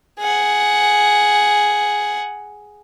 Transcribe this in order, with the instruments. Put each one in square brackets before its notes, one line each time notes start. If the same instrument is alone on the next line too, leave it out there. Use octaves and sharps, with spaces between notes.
[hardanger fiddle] G#4 F#5